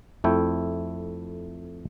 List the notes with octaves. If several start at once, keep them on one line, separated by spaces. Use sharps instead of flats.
F2 A3 E4 G5